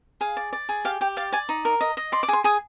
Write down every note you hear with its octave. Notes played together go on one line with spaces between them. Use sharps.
G#4 F5
D5
D5
G#4
G4 F5
G4 G5
D5 F5
D5 G#5
D#4
A#4
D#5
D#5
D5 C6
D6
G#4 C6
G#4 D#6